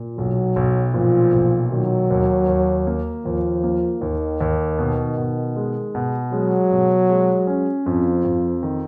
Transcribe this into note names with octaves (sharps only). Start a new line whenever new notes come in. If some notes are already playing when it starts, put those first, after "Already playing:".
Already playing: A#2
B1 F#3
B1
A#2 F3
B1
D#3 F#3
D#2
D#2
A#3
D#2 F3
A#3
D#2 D#3
D#2
B2
B2
G#3
B2
F#3 G#3
B2
G#3
C#4
F2 F3
F2
D#3